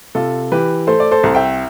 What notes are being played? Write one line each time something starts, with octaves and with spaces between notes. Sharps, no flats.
C3 F4 A4
E3 G4 B4
A3 A4 C5
D5
A4 C5
C2
E5 G5